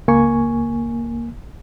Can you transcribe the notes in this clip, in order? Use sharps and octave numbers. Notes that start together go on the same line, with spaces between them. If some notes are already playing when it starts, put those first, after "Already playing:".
C#2 A#3 G#5 C#6